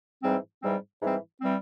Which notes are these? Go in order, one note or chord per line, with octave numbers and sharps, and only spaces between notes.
G#2 E3 G3 C4
G#2 E3 G3 C4
G#2 E3 G3 C4
E3 G3 C4